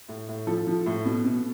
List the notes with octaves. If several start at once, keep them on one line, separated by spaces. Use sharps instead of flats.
A2
A2
F3 A4
F3
A2
B2
B2